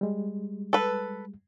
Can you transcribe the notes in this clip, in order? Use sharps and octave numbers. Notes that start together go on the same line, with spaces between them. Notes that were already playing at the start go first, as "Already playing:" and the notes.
G3 G#3
A4 B4